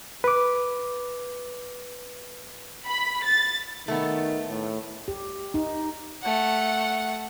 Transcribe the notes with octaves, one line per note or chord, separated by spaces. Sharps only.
B4 D6
B5
A6
D#3 A3 B3
A2
G4
D#4
A3 F#5